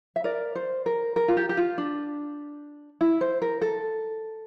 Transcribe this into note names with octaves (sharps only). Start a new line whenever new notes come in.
E5
A#4 D5
C5
A#4
A#4
F4
G4
G4
F4
D4
E4
C5
A#4
A4